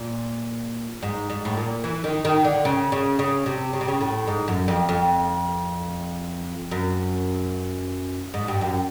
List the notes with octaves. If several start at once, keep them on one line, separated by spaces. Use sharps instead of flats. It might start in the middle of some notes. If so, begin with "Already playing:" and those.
Already playing: A#2
G#2
G#2
A2
A#2
E3
D#3
D#3
D3
C#3
C#3
C#3
C3
C#3
C3
C#3
A2
G#2
F#2
F2
F2
F#2
G#2
G2
F#2